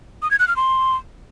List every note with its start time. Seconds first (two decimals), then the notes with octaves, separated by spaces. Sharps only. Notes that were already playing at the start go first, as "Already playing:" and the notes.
0.22 D#6
0.31 G#6
0.39 F#6
0.48 F6
0.56 C6